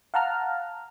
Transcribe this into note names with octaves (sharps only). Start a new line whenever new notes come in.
F5 F#5 A5 A#5 F6